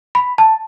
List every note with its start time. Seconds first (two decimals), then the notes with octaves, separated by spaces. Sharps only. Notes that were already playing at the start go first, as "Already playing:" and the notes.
0.15 B5
0.38 A5